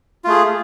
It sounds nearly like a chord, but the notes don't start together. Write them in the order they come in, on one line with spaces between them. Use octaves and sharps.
F4 A3 G#4